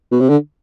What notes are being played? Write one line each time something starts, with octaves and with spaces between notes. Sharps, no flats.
B2
C3
D3